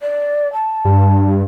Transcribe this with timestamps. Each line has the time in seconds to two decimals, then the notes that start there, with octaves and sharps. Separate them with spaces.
0.01 D5
0.53 A5
0.85 G2